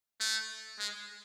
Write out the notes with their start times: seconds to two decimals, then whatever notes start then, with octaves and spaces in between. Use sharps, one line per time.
0.20 A3
0.79 G#3